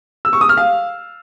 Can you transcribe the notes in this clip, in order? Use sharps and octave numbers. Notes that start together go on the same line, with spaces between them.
E6
C#6
D#6
F6
F5